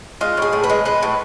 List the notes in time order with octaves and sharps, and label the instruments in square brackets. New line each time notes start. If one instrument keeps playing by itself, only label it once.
[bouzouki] G#3 F4
A2 G#4
A2
B4
G#3
G#3 B4
A2